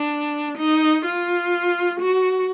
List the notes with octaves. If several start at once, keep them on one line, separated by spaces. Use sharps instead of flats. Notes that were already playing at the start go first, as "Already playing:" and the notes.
Already playing: D4
D#4
F4
F#4